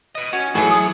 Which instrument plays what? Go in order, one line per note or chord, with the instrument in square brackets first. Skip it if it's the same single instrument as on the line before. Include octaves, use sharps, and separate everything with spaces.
[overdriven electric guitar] B4 D#5
[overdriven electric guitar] C#4 [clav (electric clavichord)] F#4
[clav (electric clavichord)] A2 E3 [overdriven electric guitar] F#3 [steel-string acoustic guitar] G#4 A4
[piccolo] D#6